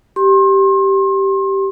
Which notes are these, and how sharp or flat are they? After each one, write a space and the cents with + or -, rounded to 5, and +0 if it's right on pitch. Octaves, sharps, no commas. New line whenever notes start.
G4 -10 C6 +35